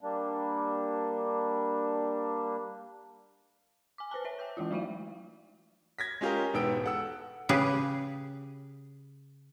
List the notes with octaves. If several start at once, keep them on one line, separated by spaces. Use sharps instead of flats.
G3 A#3 D4
G#5 D6
B4 C5 G#5 A5
B4 C#5 E5
G5 D6 G6
E3 G#3 E4 F4
F#3 A3 D#4 D5 E5 F5
G#6 A#6 B6
G#3 C#4 F4 G4 G#4 A#4
E1 G#2 B3 G5 E6 D7
A4 F#5 E6
C#3 G4 G#4 B4